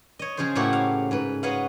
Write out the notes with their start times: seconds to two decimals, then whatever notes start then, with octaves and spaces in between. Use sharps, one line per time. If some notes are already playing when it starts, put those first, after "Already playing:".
0.19 C#5 D#5
0.37 C#3 F3 G#4 C5 C6
0.55 A2 A3 A#3 E4 F#4 G4
0.73 F5
1.11 G#2 B4
1.43 F#4 B4 C#5 D#5 F5 F#5